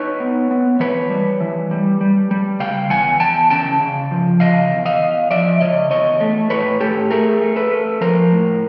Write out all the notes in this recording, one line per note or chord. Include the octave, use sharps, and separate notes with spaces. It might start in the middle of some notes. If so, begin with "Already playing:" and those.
Already playing: D#4 B4 C#5
B3
B3
E3 B4 C#5
G3
E3
G3
G3
G3
C#3 F5 G5
E2 F#5 G#5
E2 G5 A5
C#3 G5 A5
C#3
F3
C#3 D#5 F5
E2
D#5 F5
E2
F3 D5 E5
C#3 C#5 D#5
E2 C#5 D#5
A3
A2 B4 C#5
A2 G4 A4
A3 G#4 A#4
A3
A4 B4
A3
F3 A#4 C5
A2